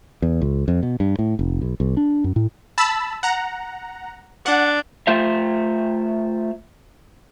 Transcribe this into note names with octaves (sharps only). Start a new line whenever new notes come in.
E2
C#2
F2
B2
G2
A2
F1
B1
C2
D4
F#2
A2
A5 B5 E6
F#5 A#5
D4 F#5
A3 F4 C5 E5